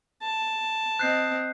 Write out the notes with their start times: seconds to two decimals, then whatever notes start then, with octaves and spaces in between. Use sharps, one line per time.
0.22 A5
0.99 C4 D#5 F#6 G6 C7